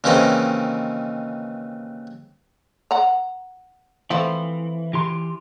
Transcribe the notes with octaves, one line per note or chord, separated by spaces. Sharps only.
D#2 C#3 E3 C4 D#4
F#5 A#5
E3 F3 A3 C4
E3 G4 C6